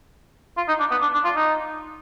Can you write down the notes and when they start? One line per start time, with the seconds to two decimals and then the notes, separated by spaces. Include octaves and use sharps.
0.57 F4
0.68 D#4
0.80 D4
0.91 B3
1.02 D4
1.14 D4
1.24 F4
1.36 D#4